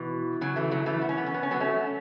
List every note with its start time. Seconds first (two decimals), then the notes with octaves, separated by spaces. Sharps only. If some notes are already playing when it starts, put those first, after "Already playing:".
Already playing: B2 E3
0.41 C#3 F#3
0.56 E3 A3
0.71 C#3 F#3
0.86 E3 A3
1.01 B3
1.09 C#4
1.18 B3
1.26 C#4
1.34 B3
1.43 C#4
1.51 F#3 B3
1.60 A3 C#4